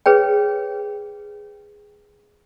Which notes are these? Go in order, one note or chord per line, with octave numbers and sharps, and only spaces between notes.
G#4 B4 C#5 G5